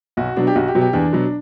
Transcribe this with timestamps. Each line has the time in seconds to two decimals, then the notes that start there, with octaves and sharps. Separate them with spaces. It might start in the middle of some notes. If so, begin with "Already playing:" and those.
0.17 B1 F#4
0.36 B2 F#3 D4
0.47 G4
0.55 B1 F#4
0.68 G4
0.75 B2 F#3
0.81 G4
0.93 E2 D4
1.12 B2 F#3